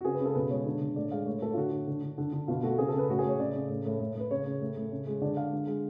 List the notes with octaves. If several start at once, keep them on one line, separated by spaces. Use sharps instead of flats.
F#4
C#3 G#4
B4
C#3
A4
B2 B4
G#3 C#5
D3
D3
A2 D5
G#3 F5
A2 C#5
A2 A4
F4
D3 F#4
D3
D3
D3
D3
D3
B2 F4
A3 F#4
C#3 G#4
A4
C#3 B4
A2 F#4
G#4
A2 C#5
C#3 D5
C#3
A2
A2
A2
A2 B4
C#3 C#5
C#3
A2
A2
C#3
G#3
D3 D5
G#3 F5
D3
G#3